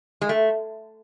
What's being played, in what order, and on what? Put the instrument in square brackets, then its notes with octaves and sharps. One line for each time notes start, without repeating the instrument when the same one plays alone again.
[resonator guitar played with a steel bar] G#3
A3